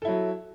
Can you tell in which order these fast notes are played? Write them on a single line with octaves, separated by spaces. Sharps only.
A4 E4 F#3